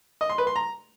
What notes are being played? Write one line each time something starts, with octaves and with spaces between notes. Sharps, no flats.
D#5
C6
B4
C6
A#5